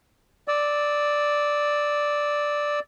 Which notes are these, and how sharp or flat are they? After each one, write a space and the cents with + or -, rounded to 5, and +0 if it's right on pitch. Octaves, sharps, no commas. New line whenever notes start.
D5 +0 E6 -20